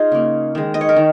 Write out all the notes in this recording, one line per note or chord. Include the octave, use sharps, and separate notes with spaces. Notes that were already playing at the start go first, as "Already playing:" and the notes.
Already playing: D#4 F4 G#4
C#3 A#3
D#3 G#3
D#5
C#5
A#4
D#3